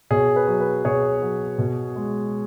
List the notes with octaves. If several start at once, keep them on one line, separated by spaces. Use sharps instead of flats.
B2 G#4 C#5
B4
F#3
B4
B2 G#4 C#5
F#3
B2
G#3